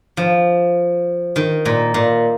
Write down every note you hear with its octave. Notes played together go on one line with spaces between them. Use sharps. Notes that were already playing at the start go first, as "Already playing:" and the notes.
F3
D#3
A#2
A#2